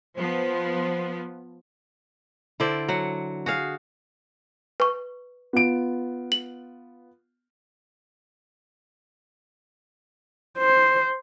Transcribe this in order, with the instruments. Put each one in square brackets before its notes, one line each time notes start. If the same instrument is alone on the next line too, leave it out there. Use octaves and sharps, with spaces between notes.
[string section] F3 B3 [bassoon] C5
[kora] D3 E4 C5 D5
F#3 F#5
F#4 G#4 F5
[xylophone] B4 C#6
[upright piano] B3 F4 D7
[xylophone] F#7
[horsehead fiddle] C5